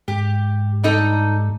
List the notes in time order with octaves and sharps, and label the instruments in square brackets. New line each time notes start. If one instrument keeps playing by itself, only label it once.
[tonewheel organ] G#2 [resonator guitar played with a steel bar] G4
[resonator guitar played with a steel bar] G3 D#4 A4